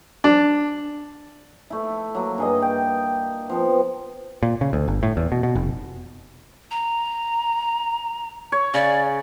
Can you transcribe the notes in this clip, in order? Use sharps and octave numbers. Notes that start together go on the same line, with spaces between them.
D4
A3 E4
F#3 A#3
G2 G#4 D#5
G5
F3 B3 C4
A#2
C#3
D2
G1
A2
E2
B2
B2
F1
A#5
C#5
C#3 D5